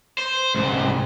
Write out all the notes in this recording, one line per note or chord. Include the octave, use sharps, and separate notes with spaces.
C5
C2 G#2